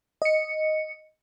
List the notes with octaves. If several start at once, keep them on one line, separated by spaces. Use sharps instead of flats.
D#5 C#7